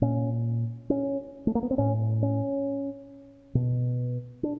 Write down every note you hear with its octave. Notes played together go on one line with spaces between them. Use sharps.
A#2 C#4
C#4
A3
A#3
B3
C4
A2 C#4
C#4
B2
D4